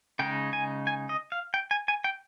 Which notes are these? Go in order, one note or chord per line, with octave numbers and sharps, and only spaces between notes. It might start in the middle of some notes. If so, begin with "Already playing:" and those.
C#3 G#3 D#4 G5
G#5
G#5
D#5
F5
G5
G#5
G#5
G5